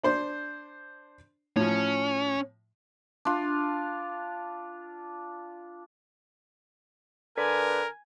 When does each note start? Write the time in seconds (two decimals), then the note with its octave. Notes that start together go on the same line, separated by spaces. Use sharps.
0.04 D4 C5 C6
1.56 A2 F3 C#4
3.25 D4 F4
7.38 D3 A#4 B4 G#5